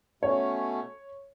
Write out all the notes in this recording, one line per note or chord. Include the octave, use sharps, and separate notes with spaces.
B2 A3 C#4 C#5